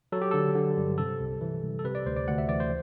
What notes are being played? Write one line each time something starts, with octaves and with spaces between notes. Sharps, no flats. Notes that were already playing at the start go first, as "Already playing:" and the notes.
F#3 A4
G4
D3 A4
D3
G2
C3 A4
C2
E3
C2
A4
C3 B4
D5
D2 C5
D5
D2 F#5
E5
E3 D5
C5